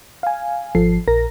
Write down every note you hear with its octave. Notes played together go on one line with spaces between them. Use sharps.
F5 G#5
G#1 F3 A4 C7
A#1 A#4 A#6